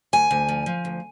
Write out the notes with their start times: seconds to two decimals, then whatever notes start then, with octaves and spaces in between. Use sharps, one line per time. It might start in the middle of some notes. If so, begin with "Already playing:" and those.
0.13 D2 G#5
0.31 D2
0.49 F3
0.66 F3
0.85 D2